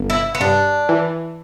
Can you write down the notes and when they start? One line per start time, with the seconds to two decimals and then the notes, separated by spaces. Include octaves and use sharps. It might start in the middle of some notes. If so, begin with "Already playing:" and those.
Already playing: G1
0.10 E4
0.35 B3
0.41 G2 D4
0.89 E3